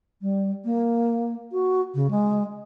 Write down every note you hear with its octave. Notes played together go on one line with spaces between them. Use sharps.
G3
A#3
F#4
C#3
G#3